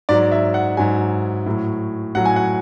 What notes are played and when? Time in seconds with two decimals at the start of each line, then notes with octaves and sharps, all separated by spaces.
0.09 G#2 F#3 D5
0.32 E5
0.54 F#5
0.77 G#2 F#3 G#5
1.46 A2 F#3
2.15 A2 F#3 F#5
2.25 G#5
2.36 F#5